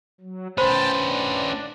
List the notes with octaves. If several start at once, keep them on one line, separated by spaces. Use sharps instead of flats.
F#3
C#4 B4 C5 G5 A5 B5 C6
D4